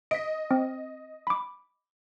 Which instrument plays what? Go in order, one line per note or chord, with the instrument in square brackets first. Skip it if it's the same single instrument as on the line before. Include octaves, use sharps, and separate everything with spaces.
[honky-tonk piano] D#5 [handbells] B6 D7
[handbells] C4
B5 D6